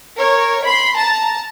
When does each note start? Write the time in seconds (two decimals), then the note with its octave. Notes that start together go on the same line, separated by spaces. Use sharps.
0.17 A#4 C#5
0.64 B5 C6
0.97 A5 A#5